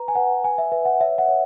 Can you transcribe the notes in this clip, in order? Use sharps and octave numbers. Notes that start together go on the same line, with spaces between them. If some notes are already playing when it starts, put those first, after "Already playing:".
Already playing: B4 A#5
G#5
B4 F#5
B4 G#5
E5
B4 E5
F#5
C#5 E5
F#5
C#5